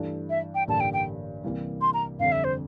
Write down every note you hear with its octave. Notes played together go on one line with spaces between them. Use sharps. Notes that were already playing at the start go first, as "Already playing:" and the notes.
Already playing: G2 E3 A3 D4
E5
G5
A1 G2 D3 G3 A#3 A5
G5
G5
C2 C3 E3 G3 A#3
C6
A#5
G1 F2 D3 G3 F5
E5
C5